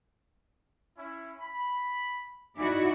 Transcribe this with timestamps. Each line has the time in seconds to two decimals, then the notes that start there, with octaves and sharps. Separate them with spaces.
0.97 C#4 E4
1.40 B5
2.57 D#4 E4 F#4 D5 G#5 D6